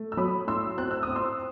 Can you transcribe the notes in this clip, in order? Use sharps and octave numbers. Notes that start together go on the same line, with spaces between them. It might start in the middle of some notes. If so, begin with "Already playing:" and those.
Already playing: A3
E6
F#3 B5 D#6
A2 C6 E6
C4 F#6
E6
C4 D#6
C6 E6